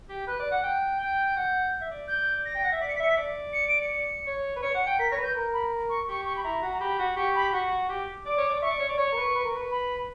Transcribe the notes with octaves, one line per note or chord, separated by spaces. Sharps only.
G4
B4 F#6
D5
F#5
G5
G5 G6
F#5
E5
D5
G6
A#6
G5
F#5
E5
D5 B6
C#7
B6
E5 C#7
B6
D5
C#7
D7
C#7
C#5
B4
C#5 C#7
F#5
G5
A#4 B6
C#5 A#6
B4
G6
A#4
B5
C#6
G4 C#6
C#6
B5
E4 A#5
F#4
A#5
G4 B5
F#4
G4 C#6
B5
F#4 C#6
G4 D6
D5 D6
C#5
D5
E5 C#6
D5
C#5
D5
C#5 C#6
A#4
B4
B4
A#4
B4
B5